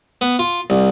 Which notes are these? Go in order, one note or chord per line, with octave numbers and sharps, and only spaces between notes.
B3
F4
C2